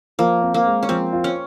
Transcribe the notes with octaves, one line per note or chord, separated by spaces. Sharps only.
F3 A#3
C4
A#3
G#3
C#4
F3 C4
F4
C#4